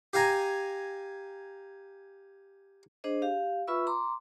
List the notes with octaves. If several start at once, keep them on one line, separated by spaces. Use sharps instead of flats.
G4 F5 G#5 A#5
D4 G#4 C5 D#5
G4 F5
F4 B4 E5 B5 C#6 E6
A#5 C6 D6